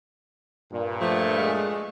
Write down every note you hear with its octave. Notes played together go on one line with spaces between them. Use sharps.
G2 A#2
F3 A3
G#3